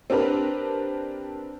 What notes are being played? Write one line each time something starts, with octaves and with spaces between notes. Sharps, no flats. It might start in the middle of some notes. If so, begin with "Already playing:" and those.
C4 D4 G4 A#4 B4